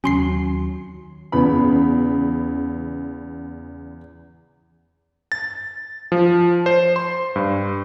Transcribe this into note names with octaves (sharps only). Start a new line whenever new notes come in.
D#2 F#3 C#4 C6 C7
E2 C#3 B3 B5
A6
F3
C5
C6
G2